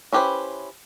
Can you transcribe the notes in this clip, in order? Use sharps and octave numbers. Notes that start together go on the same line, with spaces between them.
C#4 E4 G4 B4 C5